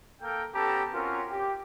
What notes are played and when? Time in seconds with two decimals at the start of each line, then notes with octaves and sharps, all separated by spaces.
0.21 A#3 A4 A#4 G5
0.54 B3 C#4 G4 A4 A5 A#5
0.93 C4 C#4 F4 F#4 A#4
1.30 G4